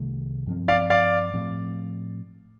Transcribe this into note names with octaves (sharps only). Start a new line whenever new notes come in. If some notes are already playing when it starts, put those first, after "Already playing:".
Already playing: C2 C3 D#3 A3
G2 F3 C4
D5 F5
D5 F5
A2 F3 C4